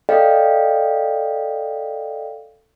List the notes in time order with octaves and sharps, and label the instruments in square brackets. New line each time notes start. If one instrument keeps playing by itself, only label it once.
[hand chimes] A4 D5 D#5 F5 G5